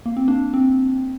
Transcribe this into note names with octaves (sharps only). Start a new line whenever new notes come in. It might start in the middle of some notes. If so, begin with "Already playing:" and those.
A#3
C4
A#3 D4
C4